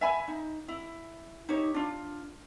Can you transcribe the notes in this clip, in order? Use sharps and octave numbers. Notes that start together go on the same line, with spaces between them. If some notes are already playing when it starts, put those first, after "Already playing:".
E5 G#5 B5
D#4
E4
D#4 G4 C#5
D4 F4